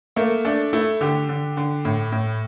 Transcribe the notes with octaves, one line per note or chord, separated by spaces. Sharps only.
A3 A#3
A3 D4
A3 E4
D3 G4
D3
D3
A2
A2